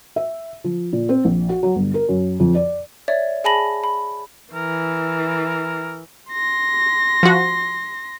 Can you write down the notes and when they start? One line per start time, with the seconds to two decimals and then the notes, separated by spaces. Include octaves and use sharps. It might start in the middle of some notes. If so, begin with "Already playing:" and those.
0.16 E5
0.64 F3
0.93 A#2
1.09 C4
1.25 A#1
1.49 F#4
1.63 F#3
1.76 G1
1.94 A#4
2.09 F#2
2.40 F2
2.55 D5
3.08 C#5 D5 E5 A6
3.44 G#4 G#5 A5 B5 A#6 F#7
3.84 B5
4.53 E3 A#4
6.32 C6 A#6
7.23 F3 F#4